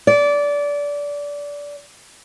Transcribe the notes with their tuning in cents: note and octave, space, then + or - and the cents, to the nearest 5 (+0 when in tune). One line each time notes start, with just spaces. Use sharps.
D5 -20